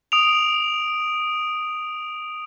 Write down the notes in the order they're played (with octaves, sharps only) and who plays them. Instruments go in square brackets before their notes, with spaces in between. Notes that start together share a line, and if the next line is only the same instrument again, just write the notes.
[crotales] D#6 D7 F7